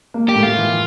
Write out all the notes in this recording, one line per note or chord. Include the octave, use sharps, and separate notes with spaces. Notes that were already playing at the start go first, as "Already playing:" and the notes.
A#3
G4
A2
F4
E3